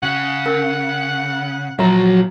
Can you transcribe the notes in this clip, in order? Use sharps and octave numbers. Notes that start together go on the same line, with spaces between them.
C#3 F#5
C#4 D4 A#4
A#2 F3 F#3 E5 A#5